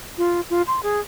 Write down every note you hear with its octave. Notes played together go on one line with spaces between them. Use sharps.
F4
F4
C6
G#4